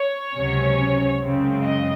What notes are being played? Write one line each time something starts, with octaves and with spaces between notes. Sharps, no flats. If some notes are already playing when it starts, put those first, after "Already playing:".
Already playing: C#5
C#2 C3 F#3 C#4
F#2 C#3 G#3 C4
D#5